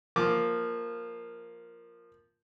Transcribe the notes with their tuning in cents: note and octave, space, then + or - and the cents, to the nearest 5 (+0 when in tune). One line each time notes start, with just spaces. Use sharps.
F3 +0 A#3 +0 D6 +0